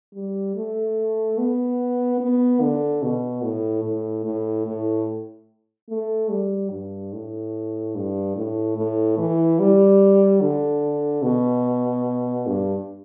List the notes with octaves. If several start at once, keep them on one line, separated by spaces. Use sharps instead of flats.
G3
A3
B3
B3
D3
B2
A2
A2
A2
A2
A3
G3
G2
A2
G2
A2
A2
E3
G3
D3
B2
G2